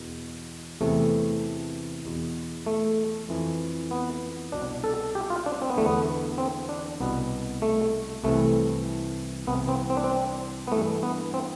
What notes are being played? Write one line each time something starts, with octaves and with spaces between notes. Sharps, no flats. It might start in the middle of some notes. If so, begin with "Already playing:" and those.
Already playing: E2 B2
E2 C3 E3 A3
E2 B2
A3
F2 E3
B3
C2 B2 D4
A4
G4
F4
D4
C4
B3
E2 D3 A3
B3
C4
D4
C2 B2 B3
A3
C2 C3 E3 A3
C2 C3 E3 B3
C4
C4
D4
C4
B3
G2 E3 A3
B3
C4